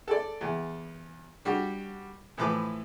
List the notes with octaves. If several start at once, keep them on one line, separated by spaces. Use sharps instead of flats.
A4 D5
E2
G3 D4 F#4 G4
A2 E3 F3 B4 D6